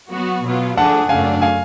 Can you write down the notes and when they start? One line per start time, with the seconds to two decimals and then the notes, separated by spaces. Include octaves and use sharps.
0.12 F#3 B3 F#4
0.44 B2 F#3 B3 F4
0.76 F3 A3 D4 G#4 F#5 A5
1.09 F#2 C#3 F#3 A3 D4 F5 G#5
1.42 F5 G#5